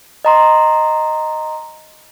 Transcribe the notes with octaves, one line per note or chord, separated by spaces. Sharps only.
D#5 A#5 C6